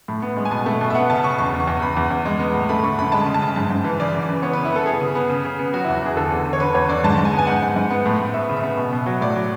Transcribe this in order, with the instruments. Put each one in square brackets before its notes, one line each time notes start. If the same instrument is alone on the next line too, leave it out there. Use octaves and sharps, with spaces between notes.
[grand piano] A2
B3
G#3
G#5
B2 A5
A3
B2
E5
B3 F#5
C#3 A5
C#3 C#6
E2 C#6
E2
C#6
E2
E2 B5
E2
E2
G#3
B3
A2
A3 B5
D3 C#6
F#2 B5
G#3 A5
C#3
A5
C#3
G#2 A5
G#2
E3
C#3 D5
F#2
E3
B3 C#5
C#3 B4
E4
B3 A4
B3 G#4
C#3
B3
C#3
C#3
B3
F#3 F#4
E2 E4
F#4
E2 G#4
D3 A4
E2
D3
C#5
D3 B4
E2 C#5
D3 D5
G#2 A5
G#2
G#5
B3
G#5
G#2 F#5
G#2
G#2
B3
A2
A2
B3 E5
C#3
E5
B3
B2
B2
F#3
A2 D5
F#3